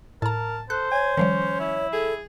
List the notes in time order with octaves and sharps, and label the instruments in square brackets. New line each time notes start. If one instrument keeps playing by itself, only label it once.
[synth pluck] A2 A#5 [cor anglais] A#4 [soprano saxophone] A5
[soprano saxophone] A4 [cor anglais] C5 [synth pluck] F#6
[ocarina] C#5 [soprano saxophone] G#5
[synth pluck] D#3 F3 G3 [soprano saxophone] C#4
[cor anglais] E4
[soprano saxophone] G#4 [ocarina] A4